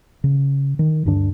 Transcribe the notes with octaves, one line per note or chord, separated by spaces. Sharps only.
C#3
D#3
D2 G2 D3 D4